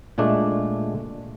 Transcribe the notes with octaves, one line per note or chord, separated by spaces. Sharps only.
A#2 G#3 A3 D4